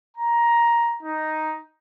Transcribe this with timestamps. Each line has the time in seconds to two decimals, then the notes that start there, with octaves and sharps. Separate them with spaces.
0.17 A#5
1.03 D#4